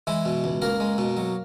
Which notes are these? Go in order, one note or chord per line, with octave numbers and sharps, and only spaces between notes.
E3 G#3 E4
B2
C#2
C#2 A#3 A#4
G#3
B2
F#3